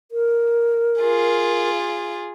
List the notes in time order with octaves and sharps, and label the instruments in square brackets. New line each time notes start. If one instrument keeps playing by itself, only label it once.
[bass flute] A#4
[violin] F4 G#4